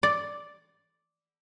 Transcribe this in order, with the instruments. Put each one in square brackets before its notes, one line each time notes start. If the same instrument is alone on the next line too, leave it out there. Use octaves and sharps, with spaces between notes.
[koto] D5